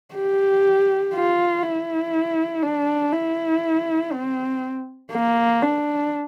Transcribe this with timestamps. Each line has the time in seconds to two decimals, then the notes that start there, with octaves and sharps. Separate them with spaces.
0.15 G4
1.14 F4
1.64 E4
2.63 D4
3.13 E4
4.13 C4
5.12 A#3
5.62 D4